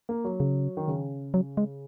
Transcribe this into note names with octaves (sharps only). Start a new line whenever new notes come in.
A#3
F#3
C#3
D#3
C#3
F#3
G#3